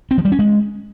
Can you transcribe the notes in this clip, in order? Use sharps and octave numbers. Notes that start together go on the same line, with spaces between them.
C4
F3
G3
C#4
G#3